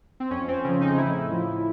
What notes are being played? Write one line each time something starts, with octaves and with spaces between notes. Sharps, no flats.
C4
F2 C#4
C4
C#3 F3 C#4
D#4
A2 E4
F3